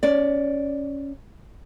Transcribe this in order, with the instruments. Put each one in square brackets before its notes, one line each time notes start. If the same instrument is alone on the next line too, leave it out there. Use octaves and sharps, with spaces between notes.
[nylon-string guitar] C#4 D5